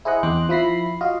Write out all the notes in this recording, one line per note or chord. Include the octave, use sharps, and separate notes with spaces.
E4 G#4 C5 D#5 F#5
E2 C4 C5 D#5 D6 F#6
F3 E4 B5 A#6 C7
F4 F#4 D#5 F5